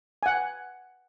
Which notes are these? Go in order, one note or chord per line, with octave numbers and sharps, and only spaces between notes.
F#5 G#5